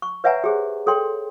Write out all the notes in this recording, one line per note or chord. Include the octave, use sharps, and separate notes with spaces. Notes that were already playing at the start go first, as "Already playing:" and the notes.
C#6
B4 C#5 E5 F#5 G#5 A#5
G4 G#4 C5
G#4 A4 C#5 G5 C6